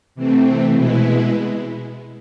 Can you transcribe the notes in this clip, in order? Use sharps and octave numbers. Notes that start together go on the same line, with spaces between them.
C3 E3 A3 C4
B2 G#3 B3 E4